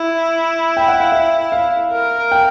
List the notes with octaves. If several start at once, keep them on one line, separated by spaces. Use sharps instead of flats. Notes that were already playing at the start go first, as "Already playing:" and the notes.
Already playing: E4
G5
F#5
F5
E5
F5
A#4
G5